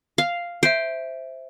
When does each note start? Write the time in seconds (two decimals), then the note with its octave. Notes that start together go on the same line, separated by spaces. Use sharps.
0.18 F5
0.63 C5 E5 D7